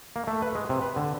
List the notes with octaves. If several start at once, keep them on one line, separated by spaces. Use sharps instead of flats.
A#3
A3
B4
G#3
C3
B4
D3